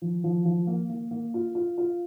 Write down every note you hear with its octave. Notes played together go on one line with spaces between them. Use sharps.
F3
F3
F3
A#3
A#3
A#3
F4
F4
F4